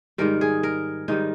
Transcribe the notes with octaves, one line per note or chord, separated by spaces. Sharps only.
G#2 D#3 G3 A#4
G#4
A#4
G#2 D#3 G3 D#4